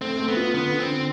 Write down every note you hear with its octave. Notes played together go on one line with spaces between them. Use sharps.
A3 C4
A3
B3
F4
D3 B3
D3
C4
D3